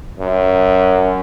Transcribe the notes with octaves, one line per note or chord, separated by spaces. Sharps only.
F#2